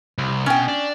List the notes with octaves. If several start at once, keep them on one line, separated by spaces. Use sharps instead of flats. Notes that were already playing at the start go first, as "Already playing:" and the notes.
C2
B2 C#4 G5
D4